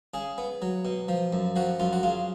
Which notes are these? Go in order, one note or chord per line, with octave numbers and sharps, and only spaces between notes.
C#3 G#4
B3
F#3
B2
F3
F#2
F3 F#4
F#2 F4
F#4
C#3 F4